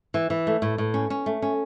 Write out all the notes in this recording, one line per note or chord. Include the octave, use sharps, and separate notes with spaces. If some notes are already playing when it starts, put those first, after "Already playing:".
E3
E3
A3
A2
A2
C#4
C#4
A3
C#4